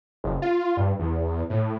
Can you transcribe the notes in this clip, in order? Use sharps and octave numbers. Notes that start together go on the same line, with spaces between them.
F#1
F4
G2
E2
A2